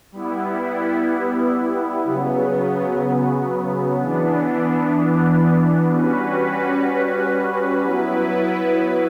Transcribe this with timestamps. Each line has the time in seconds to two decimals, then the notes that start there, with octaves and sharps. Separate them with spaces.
0.12 G3 B3 E4
2.04 C#3 F#3 B3
3.97 E3 B3 D4
5.89 G3 C#4 F#4 B4
7.82 F#3 B3 E4 B4